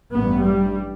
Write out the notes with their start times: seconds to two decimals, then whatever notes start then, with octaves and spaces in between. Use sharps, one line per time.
0.12 A1 G2 B3
0.45 G3